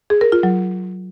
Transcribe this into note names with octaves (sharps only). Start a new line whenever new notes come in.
G#4
A#4
F4
F#3